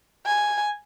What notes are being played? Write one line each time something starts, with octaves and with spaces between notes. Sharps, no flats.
G#5